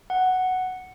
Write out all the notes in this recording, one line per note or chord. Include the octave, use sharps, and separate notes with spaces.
F#5